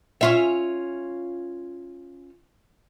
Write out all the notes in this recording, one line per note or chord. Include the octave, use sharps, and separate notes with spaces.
C#4 F4 E5